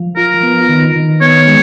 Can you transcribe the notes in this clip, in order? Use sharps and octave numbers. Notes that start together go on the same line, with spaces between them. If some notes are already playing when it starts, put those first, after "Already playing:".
Already playing: F3
F4 A#4
B3
D#3
D#3
B3 C#5
G#3